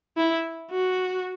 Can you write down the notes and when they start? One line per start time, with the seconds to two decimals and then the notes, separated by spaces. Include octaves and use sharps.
0.17 E4
0.71 F#4